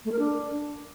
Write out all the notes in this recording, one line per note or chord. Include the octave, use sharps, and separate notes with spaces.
A3
A#4
D4